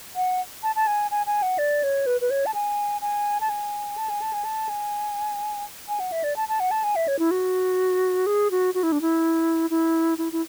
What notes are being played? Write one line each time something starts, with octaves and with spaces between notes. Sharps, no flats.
F#5
A5
A5
G#5
G#5
G#5
F#5
D5
C#5
B4
B4
C#5
A5
G#5
G#5
A5
G#5
A5
G#5
A5
G#5
A5
G#5
G#5
F#5
E5
D5
A5
A5
F#5
A5
G#5
E5
C#5
E4
F#4
G#4
F#4
F#4
E4
D4
E4
E4
E4
E4